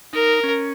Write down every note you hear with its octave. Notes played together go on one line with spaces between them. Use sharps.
D#4 A#4
C#4